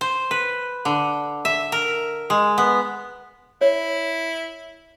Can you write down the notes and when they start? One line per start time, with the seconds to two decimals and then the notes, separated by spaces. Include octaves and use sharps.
0.01 C5
0.31 B4
0.85 D3
1.45 E5
1.72 A#4
2.30 G#3
2.58 B3
3.61 E4 C#5